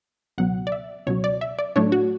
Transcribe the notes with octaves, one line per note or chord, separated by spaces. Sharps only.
C#2 B2 F#3 F#5
D5
E5
C#2 B2 F#3 C#5
D5
E5
D5
A2 F#3 A3 D4 C#5
F#4